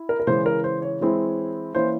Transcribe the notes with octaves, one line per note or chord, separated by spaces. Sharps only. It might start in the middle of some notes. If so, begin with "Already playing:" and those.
Already playing: E4
A#4
A#4
C#3 E3 G#3 C5
A#4
C5
C#5
E3 G#3 C4 E4
E3 A#3 C#4 E4 C5